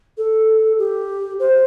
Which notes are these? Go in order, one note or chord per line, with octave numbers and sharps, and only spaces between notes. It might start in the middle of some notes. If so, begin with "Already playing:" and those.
A4
G4
C5